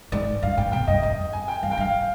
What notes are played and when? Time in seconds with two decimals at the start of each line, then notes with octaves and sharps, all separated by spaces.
0.12 G#2 D5
0.43 G2 F5
0.57 G#2 G5
0.72 B2 G5
0.87 G2 D#5
1.02 F2 D#5
1.33 G#5
1.48 G5
1.62 G2 F5
1.71 G5
1.77 G2
1.80 F5